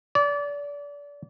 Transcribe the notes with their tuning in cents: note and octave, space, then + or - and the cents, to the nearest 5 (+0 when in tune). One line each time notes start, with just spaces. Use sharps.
D5 -30